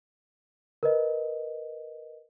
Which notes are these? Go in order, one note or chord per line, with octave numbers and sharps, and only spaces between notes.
A#4 B4 D#5